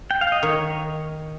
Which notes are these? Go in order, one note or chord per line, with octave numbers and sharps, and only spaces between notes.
G5
F5
D#5
D#3 C#5